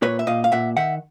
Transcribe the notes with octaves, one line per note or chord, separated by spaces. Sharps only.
A#2 B4 C#5
E5
A#2 D#5 F5
F5
A#2 E5 F#5
D#3 E5 F#5